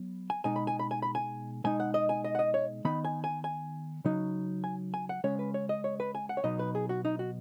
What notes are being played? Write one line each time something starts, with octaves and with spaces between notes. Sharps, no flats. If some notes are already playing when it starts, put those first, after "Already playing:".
Already playing: F#3 B3
G#5
B2 G#3 D#4 G#5
B5
G#5
B5
G#5
B5
G#5
B2 G#3 D#4 G#5
F#5
D#5
G#5
D#5
F#5
D#5
C#5
D#3 B3 D#4 B5
G#5
G#5
G#5
C#3 F#3 D#4
G#5
G#5
F#5
C#3 G#3 C#4 C#5
B4
C#5
D#5
C#5
B4
G#5
F#5
C#5
B2 F#3 B3 D#4 D#5
B4
G#4
F#4
D#4
F#4